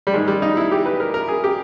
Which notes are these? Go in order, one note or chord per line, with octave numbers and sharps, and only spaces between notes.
G3
G#2 D#3 G#3
G3
D#4
E4
G4
B4
A#4
A#4
G#4
G4